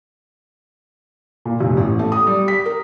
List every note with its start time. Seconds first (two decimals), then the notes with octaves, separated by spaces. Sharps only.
1.45 A#2
1.60 F1
1.77 A1
1.99 A3
2.12 D#6
2.27 G3
2.48 B6
2.66 A#4